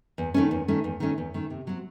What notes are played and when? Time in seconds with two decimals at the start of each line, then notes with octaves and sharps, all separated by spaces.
0.18 E2
0.34 D#3 A3 C#4
0.51 E2
0.68 D#3 A3 C#4
0.84 E2
1.00 D#3 A3 C#4
1.18 E2
1.34 D#3 A3 C#4
1.50 C3
1.67 F#3 C4